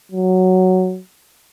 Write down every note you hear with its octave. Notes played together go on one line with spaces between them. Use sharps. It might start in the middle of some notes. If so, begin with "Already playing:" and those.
F#3